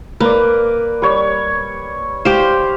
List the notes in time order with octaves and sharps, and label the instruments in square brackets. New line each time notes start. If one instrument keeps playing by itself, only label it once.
[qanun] A#3 [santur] B4 D5
[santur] G3 C#5
[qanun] G4 C5 [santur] F5